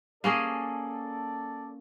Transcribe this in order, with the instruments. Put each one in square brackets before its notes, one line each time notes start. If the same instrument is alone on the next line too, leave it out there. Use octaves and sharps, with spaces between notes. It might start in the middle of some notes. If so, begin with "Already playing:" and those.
[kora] A#3 C#4 G#4 [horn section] A4 D5